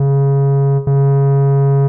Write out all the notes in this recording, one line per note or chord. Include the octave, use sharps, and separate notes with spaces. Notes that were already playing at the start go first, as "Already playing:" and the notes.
Already playing: C#3
C#3